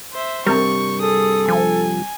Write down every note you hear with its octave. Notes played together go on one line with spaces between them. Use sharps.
C5 E5
G2 C3 G3 A#4 C#6
G#4 A4 D#6
F3 G#5